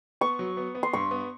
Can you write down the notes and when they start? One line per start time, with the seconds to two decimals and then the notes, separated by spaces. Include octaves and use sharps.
0.21 B3 C#6
0.39 F#3
0.57 B3
0.75 B3
0.83 C6
0.93 G2 C#6
1.11 B3